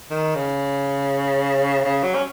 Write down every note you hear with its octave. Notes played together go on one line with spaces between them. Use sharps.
D#3
C#3
C#3
F#3
C#4